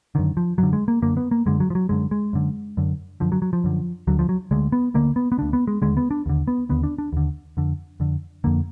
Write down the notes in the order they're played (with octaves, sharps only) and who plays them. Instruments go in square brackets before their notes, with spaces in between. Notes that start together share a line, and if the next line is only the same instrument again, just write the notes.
[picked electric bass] F#2 D3 D#3
F3
F#2 D3 F#3
G#3
A#3
F#2 D3 A#3
B3
A#3
F#2 D3 G#3
F#3
F3
F#3
F#2 D3 G#3
G#3
F#2 D3
F#2 D3
F#2 D3 F3
F#3
F#3
F3
F#2 D3
D2 D3 F#3
F3
F#3
D2 D3 G#3
B3
D2 D3 A#3
B3
B3
D2 D3 D4
B3
G#3
D#2 D3 G#3
B3
D4
D#2 D3
B3
D#2 D3 B3
D4
D4
D#2 D3
F2 D3
F2 D3
F2 D3 A#3